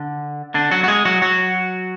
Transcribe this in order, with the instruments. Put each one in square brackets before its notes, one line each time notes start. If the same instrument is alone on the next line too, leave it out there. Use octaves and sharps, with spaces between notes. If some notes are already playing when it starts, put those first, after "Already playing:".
Already playing: [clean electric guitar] D3
D3 D4
F#3 F#4
F#4
G#3 G#4
F#3 F#4
F#3 F#4